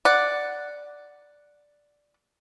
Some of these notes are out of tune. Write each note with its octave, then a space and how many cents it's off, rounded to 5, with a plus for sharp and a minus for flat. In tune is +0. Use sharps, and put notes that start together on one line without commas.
D5 +0 F#5 +0